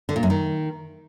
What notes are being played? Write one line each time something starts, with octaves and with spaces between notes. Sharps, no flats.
D3
A#2
F#2
D#3